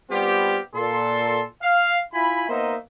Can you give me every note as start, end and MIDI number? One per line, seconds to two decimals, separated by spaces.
0.11 0.58 55
0.11 0.58 59
0.11 0.58 60
0.11 0.58 65
0.11 0.58 67
0.75 1.43 46
0.75 1.43 69
0.75 1.43 84
1.62 1.98 77
2.13 2.46 64
2.13 2.46 65
2.13 2.46 80
2.13 2.46 83
2.49 2.75 58
2.49 2.75 59
2.49 2.75 63
2.49 2.75 72
2.49 2.75 75
2.49 2.75 76